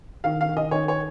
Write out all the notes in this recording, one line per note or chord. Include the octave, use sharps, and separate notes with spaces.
D#3 F5
F5
D#3
D#5
D#3 C#5
C#5